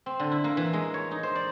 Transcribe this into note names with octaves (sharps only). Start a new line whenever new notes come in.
C4
D3
E4
A#3
E3
G#3
C#5
D#4
C5
D5